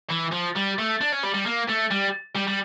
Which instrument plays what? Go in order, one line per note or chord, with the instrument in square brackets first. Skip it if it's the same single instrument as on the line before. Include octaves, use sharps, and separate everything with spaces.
[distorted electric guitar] E3
F3
G3
A3
D4
C#4
G3
G3
A#3
A3
G3
G3
G3